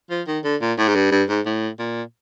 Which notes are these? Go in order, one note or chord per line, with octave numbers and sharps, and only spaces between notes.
F3
D#3
D3
A#2
A2
G#2
G2
G2
G#2
A2
A#2